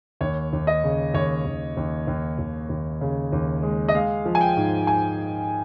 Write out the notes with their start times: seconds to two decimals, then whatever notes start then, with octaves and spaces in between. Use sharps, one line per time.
0.21 D#2 C#5
0.53 D#2
0.67 D#5
0.84 C#3
1.14 D#2 C#5
1.45 D#2
1.77 D#2
2.07 D#2
2.39 D#2
2.69 D#2
3.01 C#3
3.32 D#2
3.63 G#3
3.88 D#5
3.94 G#3 F5
4.25 F3
4.35 G#5
4.41 G5
4.57 G#2
4.87 G#5